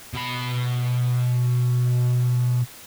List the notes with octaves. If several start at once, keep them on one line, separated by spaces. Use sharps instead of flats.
B2 B5